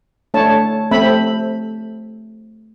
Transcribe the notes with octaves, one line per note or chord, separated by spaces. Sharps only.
A3 D4 C#5 A5
A3 C4 E5 B5